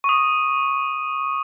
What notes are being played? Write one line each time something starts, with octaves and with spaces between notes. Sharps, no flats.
C#6
D#6